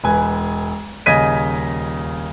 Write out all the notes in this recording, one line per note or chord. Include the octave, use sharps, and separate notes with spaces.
E1 B4 G#5
D#1 C#3 D#5 G#6 B6 D#7